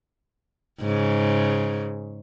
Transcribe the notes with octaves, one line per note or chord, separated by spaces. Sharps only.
G#2 C#3